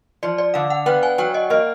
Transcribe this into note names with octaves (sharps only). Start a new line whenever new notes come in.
F3 D5
D5
D3 F5
F#5
B3 G5
G#5
F#3 G5
D#5
A#3 D#5